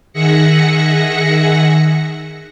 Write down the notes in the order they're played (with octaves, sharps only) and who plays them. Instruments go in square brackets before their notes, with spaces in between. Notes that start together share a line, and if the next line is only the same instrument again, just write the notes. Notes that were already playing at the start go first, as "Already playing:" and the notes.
[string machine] D#3 G#4 E5 F#5 A#6 C#7